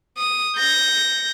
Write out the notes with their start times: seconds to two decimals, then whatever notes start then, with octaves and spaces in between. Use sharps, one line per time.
0.18 D#6
0.56 G6 A#6